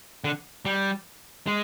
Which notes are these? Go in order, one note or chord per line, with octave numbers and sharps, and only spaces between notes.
D3
G3
G#3